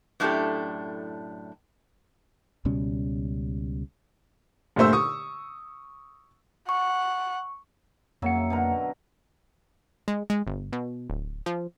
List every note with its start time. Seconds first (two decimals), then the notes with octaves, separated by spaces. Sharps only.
0.20 F#2 A2 D4 E4 G4 A4
2.65 C#2 B2 G3 C#4
4.76 G1 A#2 D3 A3 C5 E6
4.93 C#6 D#6
6.69 F#5 C#6
8.22 F2 C#3 F#3 A#3 E5 C#7
8.50 B2 D3 A#4
10.08 G#3
10.30 G#3
10.47 G1
10.73 B2
11.10 D1
11.46 F3